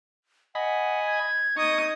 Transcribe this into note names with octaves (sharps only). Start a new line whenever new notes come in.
D#5 F#5 G#5 B5
G#6
D#4 C#6 D#6